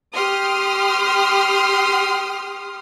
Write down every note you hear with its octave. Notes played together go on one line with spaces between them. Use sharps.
G4 C6 D#6 F6